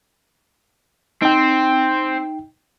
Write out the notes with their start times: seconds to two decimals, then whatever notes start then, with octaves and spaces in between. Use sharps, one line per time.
1.22 C4 D#4 G5